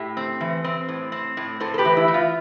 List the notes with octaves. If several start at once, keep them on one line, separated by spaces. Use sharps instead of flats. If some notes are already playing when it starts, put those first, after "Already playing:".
Already playing: A2 G4
C4
E3
C4
A2
C4
A2
A2 A4 C5
A4
G4 B4
E3
E4
E3
F4